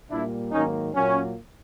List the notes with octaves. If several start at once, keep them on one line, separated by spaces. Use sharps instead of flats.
A#2 G3 A#3 D4 E4
G#2 D#3 F#3 A#3 C#4 D#4
A#2 F#3 A#3 C#4